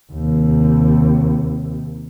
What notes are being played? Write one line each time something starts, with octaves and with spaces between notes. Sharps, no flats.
D#2 C3